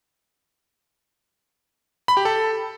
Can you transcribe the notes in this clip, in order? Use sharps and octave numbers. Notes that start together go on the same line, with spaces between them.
B5
G4
A4